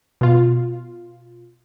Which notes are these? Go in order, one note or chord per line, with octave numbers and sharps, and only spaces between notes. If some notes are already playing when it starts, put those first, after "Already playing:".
B2 F4